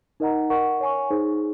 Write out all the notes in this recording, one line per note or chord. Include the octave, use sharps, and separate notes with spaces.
D#4 A#4 D#5 F#5 A#5
A#4 D#5 F#5 C#6
C#5 G#5 C#6
D#4 G#4 C5